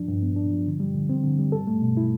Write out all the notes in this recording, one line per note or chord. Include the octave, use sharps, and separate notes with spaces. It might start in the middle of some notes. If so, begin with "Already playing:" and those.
Already playing: F3 D4
G2
B3
D4
F3
D3
G3
D3
C4
D3
G3
A4
A3
B2
E4